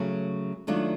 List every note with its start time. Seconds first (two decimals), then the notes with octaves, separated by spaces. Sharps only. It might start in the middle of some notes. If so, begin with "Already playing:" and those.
Already playing: C#3 F#3 A3
0.67 D#3 F#3 A3 D4 F4